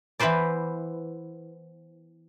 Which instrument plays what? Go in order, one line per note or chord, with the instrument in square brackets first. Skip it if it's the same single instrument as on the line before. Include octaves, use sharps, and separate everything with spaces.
[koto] E3 B3 E4 B4 C5 D5